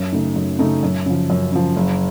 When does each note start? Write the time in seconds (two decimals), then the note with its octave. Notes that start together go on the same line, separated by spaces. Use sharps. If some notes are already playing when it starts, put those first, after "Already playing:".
Already playing: F#2
0.12 C#3 A3 D#4
0.36 F#2
0.59 C#3 A3 D#4
0.83 F#2
1.06 C#3 F3
1.30 F#2
1.52 C#3 F3
1.76 F#1